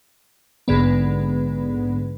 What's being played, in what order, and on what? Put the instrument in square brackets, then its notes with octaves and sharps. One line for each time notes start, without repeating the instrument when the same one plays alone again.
[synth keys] A#1 G#2 D3 B3